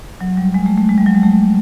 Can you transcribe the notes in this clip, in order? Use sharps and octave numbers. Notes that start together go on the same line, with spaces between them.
F#3
G3
G#3
A3
A3
G#3
G3
F#3
G#3
A3